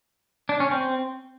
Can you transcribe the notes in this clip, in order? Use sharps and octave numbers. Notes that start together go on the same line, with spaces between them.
D4
C#4
C4